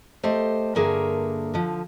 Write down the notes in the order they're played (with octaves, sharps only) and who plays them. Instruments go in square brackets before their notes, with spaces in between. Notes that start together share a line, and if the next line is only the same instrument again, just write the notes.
[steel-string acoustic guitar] A3 G4 C5 D#5
G2 D3 A#3 G#4 A#4 E5
D3 F3